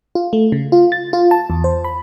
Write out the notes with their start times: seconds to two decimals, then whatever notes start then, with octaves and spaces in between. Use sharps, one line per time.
0.15 F4
0.33 A3
0.52 C#3
0.72 F4
0.92 A6
1.13 F4
1.31 A5
1.50 E2
1.64 C5
1.84 B5